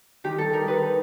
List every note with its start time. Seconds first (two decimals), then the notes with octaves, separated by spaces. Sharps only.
0.24 D#3 G4
0.38 G3 A4
0.53 D#4 A#4
0.67 D#3 B4
0.82 D#4